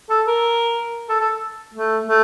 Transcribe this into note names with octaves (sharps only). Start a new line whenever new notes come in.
A4
A#4
A4
A4
A3
A3